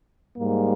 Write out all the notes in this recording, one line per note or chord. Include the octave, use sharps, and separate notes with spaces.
G#2 G3 A#3